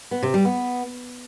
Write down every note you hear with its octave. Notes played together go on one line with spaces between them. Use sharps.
B3
C3
G3
B3